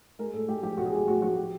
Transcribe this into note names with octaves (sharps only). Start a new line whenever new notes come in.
G#3 A#4
A2 A4
G#3 G4
F3 G4
B1 F#4
G#4
G#3 G4
A2 F#4
F3 F#4
G4